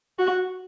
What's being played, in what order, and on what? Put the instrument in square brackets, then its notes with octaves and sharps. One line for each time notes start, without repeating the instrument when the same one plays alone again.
[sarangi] F#4